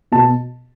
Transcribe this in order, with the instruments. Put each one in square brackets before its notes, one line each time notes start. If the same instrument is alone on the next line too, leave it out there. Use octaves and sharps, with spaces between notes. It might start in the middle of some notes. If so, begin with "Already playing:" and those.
[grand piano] B2 A5